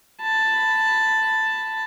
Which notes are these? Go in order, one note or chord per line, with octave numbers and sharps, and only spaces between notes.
A5 B5